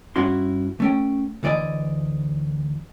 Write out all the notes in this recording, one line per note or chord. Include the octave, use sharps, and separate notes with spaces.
G2 C#4 E4 F#4 C6
A3 C#4 G5
D2 E3 D5 D#5 G#5